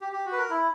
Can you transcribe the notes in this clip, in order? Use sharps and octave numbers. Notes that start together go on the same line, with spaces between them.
G4
G4
F#4
B4
A#4
E4